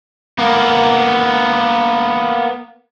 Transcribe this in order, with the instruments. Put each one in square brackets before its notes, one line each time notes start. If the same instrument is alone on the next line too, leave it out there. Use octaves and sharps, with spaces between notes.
[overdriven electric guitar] A#3 B3